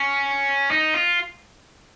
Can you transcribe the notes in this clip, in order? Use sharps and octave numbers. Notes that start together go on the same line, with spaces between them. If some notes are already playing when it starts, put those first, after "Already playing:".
Already playing: C#4
D#4
F4